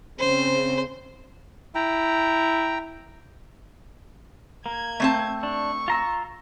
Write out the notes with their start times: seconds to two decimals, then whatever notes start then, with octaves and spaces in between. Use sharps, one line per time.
0.19 C#3 C4 C5
1.75 E4 G5 A#5
4.66 A#3 G#6
5.00 A3 C4 A5
5.43 D4 C#6
5.88 F4 A#5 E6